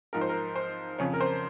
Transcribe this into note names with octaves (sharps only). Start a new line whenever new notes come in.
G#2 F3 A#4
C5
A#4
C5
F2 C#3 F3 C#5
A#4
C5